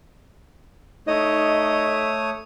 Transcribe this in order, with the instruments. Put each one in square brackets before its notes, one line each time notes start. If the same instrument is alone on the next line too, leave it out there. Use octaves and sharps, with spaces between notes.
[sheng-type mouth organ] A3 C#5 D#6 [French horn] D#4 [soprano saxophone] D#5